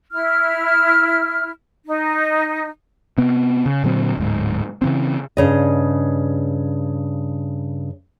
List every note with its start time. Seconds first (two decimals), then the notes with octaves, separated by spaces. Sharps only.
0.12 E4 F6
1.86 D#4
3.18 C3 B3
3.66 C#3
3.84 A#2 D3 F#3 C4
4.17 D1 G#2
4.82 C#3 E3 C4
5.37 G2 C#3 D#5